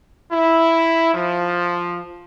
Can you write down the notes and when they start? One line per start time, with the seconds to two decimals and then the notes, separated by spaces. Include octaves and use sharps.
0.32 E4
1.15 F3